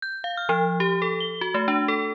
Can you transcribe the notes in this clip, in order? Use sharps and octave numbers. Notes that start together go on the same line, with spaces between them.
G6
F5
F6
F3
G4
A4
G7
F#4
A3
D4
A4